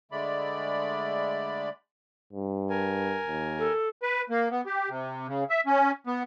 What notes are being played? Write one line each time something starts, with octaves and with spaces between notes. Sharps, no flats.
D3 G#3 A3 D5 B5
G2
A#4 G#5
D#2
A4
B4
A#3
B3
G4
C3
C#3
E5
C#4
B3